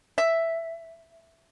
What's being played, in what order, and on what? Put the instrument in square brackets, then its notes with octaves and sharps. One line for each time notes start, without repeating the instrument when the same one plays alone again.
[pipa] E5